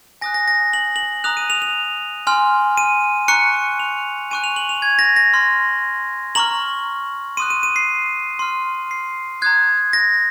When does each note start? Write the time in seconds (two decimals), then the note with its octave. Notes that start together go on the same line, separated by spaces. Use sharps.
0.21 G#5 D#6 F#6 A#6
0.34 A#6
0.48 A#6
0.73 F#7
0.96 F#7
1.24 A#5 D#6 F#6 F7
1.37 D#7
1.50 F7
1.62 F7
2.27 G#5 C6 F6
2.77 D#7
3.28 A#5 C#6 F#6 C#7
3.80 F7
4.31 G#5 C#6 F#6 D#7
4.44 F7
4.56 F#7
4.69 F7
4.82 G#6
4.99 A#6
5.16 A#6
5.33 C6 F6
6.35 A#5 C#6 F6 F#7
7.37 C6 D#6 F#6 D#7
7.50 D#7
7.63 D#7
7.76 C7
8.39 C6 F6
8.91 C7
9.42 A#5 D#6 F#6 G#6
9.93 A#6